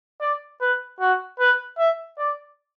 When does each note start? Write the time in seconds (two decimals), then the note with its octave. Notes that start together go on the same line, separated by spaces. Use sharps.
0.21 D5
0.61 B4
1.00 F#4
1.39 B4
1.78 E5
2.18 D5